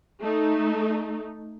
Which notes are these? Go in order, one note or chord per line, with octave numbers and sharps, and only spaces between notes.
A3 D#4